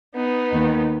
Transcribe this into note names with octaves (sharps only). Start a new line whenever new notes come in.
B3 D#4
D#2 D#3